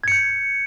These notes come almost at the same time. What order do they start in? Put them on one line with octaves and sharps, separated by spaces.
G#6 C#7 G6